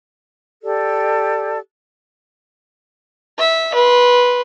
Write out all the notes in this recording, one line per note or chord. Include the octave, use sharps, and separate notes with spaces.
G4 A4 D5
E5
B4 C6